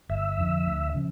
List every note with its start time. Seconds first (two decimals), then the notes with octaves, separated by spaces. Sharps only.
0.09 G1 E5
0.38 F2 D3 F3
0.66 D2
0.95 C#3 F3